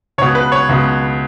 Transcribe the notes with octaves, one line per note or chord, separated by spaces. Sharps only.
C#2 B2 C#5
B4
C#5
C#2 B2